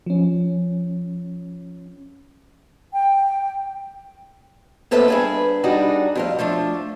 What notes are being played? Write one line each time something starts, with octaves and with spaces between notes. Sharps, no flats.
F3 C#4
G5
A#3 B3 A4 B4 C5 E5
G2 G#4 B4
G3 D4 D#4 F#4 G#4
F2 A2 F5
F3 A3 D4 F4